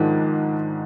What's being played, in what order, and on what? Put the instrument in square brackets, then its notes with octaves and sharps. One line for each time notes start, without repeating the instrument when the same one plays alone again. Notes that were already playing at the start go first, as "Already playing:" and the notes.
Already playing: [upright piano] G#2 F3 G#3 D4 [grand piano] D#3